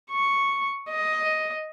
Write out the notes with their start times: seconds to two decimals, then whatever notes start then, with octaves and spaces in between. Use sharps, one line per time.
0.11 C#6
0.90 D#5